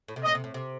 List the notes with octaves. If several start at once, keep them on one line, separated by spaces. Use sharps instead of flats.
A2
C3
A2 D#5
C3
A2
C3